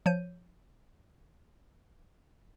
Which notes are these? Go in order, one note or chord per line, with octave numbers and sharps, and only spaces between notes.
F3 C#5 G6 D#7